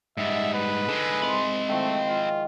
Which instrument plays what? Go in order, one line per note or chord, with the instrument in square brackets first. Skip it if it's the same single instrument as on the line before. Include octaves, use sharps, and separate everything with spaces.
[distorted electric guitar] G#2 G3 [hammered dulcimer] D#4 F#5 [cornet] E5
[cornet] B4
[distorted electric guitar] D3 G#3 [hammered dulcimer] G#4 A4 B5
[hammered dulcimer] G#2 E4 C6 [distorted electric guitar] C4 B5
[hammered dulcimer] D#3 F3 [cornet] A3
[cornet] F4